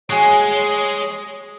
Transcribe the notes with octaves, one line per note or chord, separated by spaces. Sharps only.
G#3 F#4 G#4 C#5